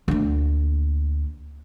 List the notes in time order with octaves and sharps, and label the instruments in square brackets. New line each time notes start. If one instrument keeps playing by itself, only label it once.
[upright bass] D2 A#3